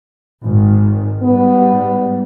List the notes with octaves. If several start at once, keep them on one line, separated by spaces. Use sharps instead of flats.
G#1 D#3
G#2 G3 B3